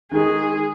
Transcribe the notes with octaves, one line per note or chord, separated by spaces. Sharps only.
D#3 G#3 D#4 G#4